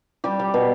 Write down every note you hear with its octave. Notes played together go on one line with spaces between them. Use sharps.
G3 G4
G3
B2